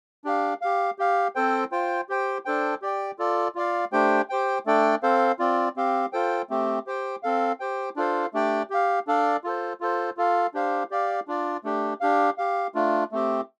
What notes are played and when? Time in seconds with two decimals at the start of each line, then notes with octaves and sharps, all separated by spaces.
0.24 D4 G4 F5
0.61 G4 F5
0.99 G4 F5
1.35 C4 A4 C5 G5
1.72 F4 C5 G5
2.09 G4 C5 G5
2.45 D4 A4 C5 G5
2.82 G4 D5 G5
3.19 F4 A4 D5
3.55 F4 D5 F5
3.92 A3 D4 G4 C5 G5
4.29 G4 C5 G5
4.66 A3 D4 A4 D5 G5
5.03 C4 A4 C5 F5
5.39 C4 F4 D5
5.76 C4 G4 F5
6.13 F4 A4 C5 G5
6.50 A3 C4 G4
6.86 G4 C5 G5
7.23 C4 A4 F5
7.60 G4 C5 G5
7.96 D4 F4 A4 C5 F5
8.34 A3 D4 G4 D5 G5
8.70 G4 F5
9.07 D4 A4 D5 F5
9.44 F4 A4 C5
9.80 F4 A4 C5
10.17 F4 A4 F5
10.54 D4 G4 C5 F5
10.91 G4 D5 F5
11.28 D4 F4 D5
11.64 A3 D4 G4
12.01 D4 G4 F5
12.38 G4 F5
12.75 A3 D4 F4
13.12 A3 C4 G4